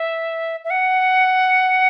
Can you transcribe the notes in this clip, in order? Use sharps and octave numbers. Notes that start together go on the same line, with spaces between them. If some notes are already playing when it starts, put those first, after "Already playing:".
Already playing: E5
E5
F#5